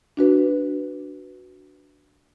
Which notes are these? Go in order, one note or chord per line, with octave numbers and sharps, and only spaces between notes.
D4 F#4 B4